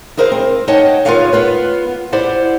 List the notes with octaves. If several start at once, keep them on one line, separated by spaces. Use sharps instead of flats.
E4 G#4 A#4 C5 E5 F5
C4
D#4 C#5 D#5 F#5 G5 A5
F4 G#4 A#4 B4 C#5 F5
B3 F4 B4
E4 G4 C5 D5 F#5